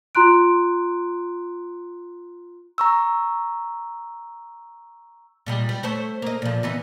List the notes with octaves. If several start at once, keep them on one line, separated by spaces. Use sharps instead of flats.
F4 A#5 C6 F#6 D7
A#5 C#6 E6
A#2 G3 G#3
G3
A3 C5 C#5
A#3 D#5
A#2 F3
E3 B3 D#4